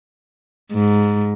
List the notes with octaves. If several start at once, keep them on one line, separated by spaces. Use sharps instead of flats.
G#2